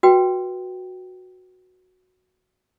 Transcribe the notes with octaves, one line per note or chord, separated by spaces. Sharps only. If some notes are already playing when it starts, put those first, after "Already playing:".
F#4 B4 G5